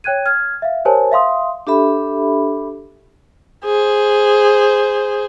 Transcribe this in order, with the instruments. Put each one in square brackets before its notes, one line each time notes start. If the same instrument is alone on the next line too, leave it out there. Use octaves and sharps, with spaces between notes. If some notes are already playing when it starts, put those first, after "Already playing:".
[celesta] C#5 G5 F#6 G#6 D#7
F6 G#6
E5 F5
G4 A#4 C5 C#5 G#5 A5
E5 F5 C6 D#6
[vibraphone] D4 G4 A4 E5 B5
[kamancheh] G#4 C5